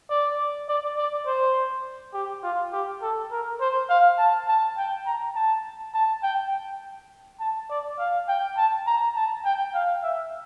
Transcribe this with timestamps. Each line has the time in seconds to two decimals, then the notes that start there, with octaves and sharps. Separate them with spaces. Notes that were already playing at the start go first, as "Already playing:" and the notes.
0.10 D5
0.69 D5
0.97 D5
1.26 C5
2.14 G4
2.43 F4
2.72 G4
3.02 A4
3.31 A#4
3.61 C5
3.90 F5
4.18 A5
4.47 A5
4.78 G5
5.06 A#5
5.35 A5
5.94 A5
6.23 G5
7.40 A5
7.70 D5
7.99 F5
8.28 G5
8.57 A5
8.87 A#5
9.16 A5
9.45 G5
9.74 F5
10.03 E5